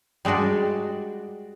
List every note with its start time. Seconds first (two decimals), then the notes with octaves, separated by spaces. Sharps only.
0.25 G3 G#3 D4 F#4 D5